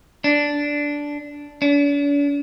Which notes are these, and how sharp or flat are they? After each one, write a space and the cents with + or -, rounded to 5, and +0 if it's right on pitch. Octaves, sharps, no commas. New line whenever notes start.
D4 -10
D4 -45